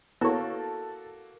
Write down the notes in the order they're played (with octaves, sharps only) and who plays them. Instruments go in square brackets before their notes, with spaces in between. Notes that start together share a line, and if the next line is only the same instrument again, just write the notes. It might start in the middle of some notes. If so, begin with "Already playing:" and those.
[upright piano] A#3 F#4 [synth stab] B3 C#5 [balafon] E4 [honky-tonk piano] A4